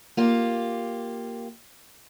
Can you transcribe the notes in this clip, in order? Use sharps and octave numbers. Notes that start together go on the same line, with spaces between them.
A#3 F4 G4